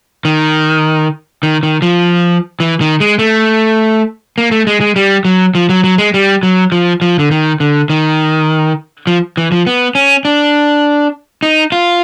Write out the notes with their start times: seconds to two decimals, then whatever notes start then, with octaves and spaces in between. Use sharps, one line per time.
0.25 D#3
1.43 D#3
1.63 D#3
1.82 F3
2.60 E3
2.81 D#3
3.00 G#3
3.19 A3
4.38 A#3
4.51 A3
4.67 G#3
4.81 G#3
4.96 G3
5.25 F#3
5.55 F3
5.69 F#3
5.84 F#3
5.98 G#3
6.14 G3
6.43 F#3
6.72 F3
7.02 F3
7.19 D3
7.31 D#3
7.60 D3
7.90 D#3
9.07 F3
9.37 E3
9.52 F3
9.67 B3
9.95 C#4
10.25 D4
11.43 D#4
11.72 F4